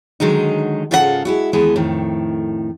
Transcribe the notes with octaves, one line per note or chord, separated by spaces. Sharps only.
D3 D#3 F#3 G#3 D#4
G#2 C#3 F4 A4 B4 F#5
G#3 E4 F#4
D#2 E3 G#3 B3 A5
F2 A2 D#3